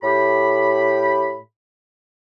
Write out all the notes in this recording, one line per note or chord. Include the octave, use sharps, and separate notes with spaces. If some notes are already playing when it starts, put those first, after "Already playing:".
A2 G4 B5